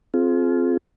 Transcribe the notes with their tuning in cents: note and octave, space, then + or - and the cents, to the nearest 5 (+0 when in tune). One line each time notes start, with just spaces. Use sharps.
C4 +0 F4 +0 G#4 +40